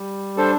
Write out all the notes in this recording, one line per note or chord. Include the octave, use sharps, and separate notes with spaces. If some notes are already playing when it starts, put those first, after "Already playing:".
Already playing: G3
D4 A4 C5